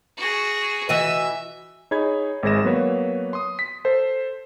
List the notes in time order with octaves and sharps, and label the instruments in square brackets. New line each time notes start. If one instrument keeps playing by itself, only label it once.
[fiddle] F#4 G#4
[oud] E3 F#4 D#5 [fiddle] E5
[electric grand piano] D#4 G#4 C#5 B5 G#6
G#1 G#3 G#4 A#6 E7
F#3 A#3 B3 B4 C#5
C6 D#6
B6
A4 C5